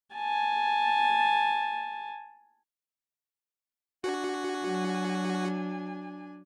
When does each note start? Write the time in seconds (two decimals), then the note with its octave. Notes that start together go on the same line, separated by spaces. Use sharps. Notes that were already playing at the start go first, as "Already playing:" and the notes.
0.15 G#5 A5
4.04 D4 F#4 G#5
4.65 F#3